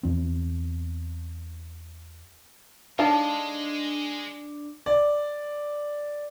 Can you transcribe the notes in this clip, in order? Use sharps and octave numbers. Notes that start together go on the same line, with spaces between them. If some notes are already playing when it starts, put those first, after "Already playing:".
E2 C4
G#3 D4 D#4 A4 C#5 F5 A5
D5